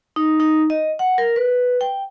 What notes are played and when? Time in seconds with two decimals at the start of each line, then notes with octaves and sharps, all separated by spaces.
0.16 D#4
0.40 D#4
0.70 D#5
0.99 F#5
1.18 A#4
1.36 B4
1.81 G5